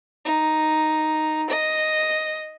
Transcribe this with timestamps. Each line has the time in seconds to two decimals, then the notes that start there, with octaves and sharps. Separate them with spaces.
0.25 D#4
1.50 D#5